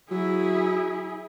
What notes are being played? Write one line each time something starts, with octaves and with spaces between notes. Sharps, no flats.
F#3 E4 G#4